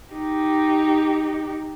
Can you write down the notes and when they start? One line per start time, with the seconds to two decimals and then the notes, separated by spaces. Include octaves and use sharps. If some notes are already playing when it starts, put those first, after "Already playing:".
0.13 D#4 G4